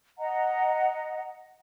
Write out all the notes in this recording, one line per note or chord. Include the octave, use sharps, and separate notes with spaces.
D#5 F#5 A#5